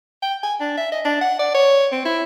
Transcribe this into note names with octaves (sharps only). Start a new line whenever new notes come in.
G5
G#5
D4
E5
D#5
D4
F#5
D5
C#5
C4
E4